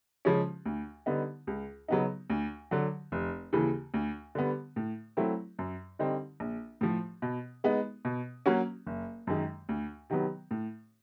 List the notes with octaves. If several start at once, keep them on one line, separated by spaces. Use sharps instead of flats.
C#3 F3 G#3 C#4
D2
D3 G3 B3 D#4
C#2
C#3 F#3 B3 D#4
D2
D3 F#3
F1
D#2 C#3 E3
D2
D3 G3 B3
A2
F#3 A3 C4 E4
F#2
D3 G3 C4 D#4
A#1
A2 F3
B2
G#3 B3 D#4
B2
F#3 A#3 C#4 F#4
F#1
F#2 D#3 G#3
D2
C3 D#3 F#3 B3
A2